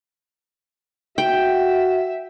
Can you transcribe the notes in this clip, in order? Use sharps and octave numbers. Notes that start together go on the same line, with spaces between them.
F#4 E5 G5